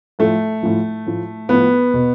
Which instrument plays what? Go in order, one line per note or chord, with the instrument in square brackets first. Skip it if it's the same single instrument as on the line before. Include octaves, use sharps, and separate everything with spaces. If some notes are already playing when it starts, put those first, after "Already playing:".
[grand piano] A2 F3 A3
A2 F3
A2 F3
A2 F3 B3
B2